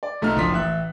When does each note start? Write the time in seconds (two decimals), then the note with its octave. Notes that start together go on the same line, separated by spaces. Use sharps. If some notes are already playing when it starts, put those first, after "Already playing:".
0.03 D5
0.22 B1 A3 D#4 F4 F6
0.36 F#1 F3 D4 C6 B6
0.52 A1 E5 F#6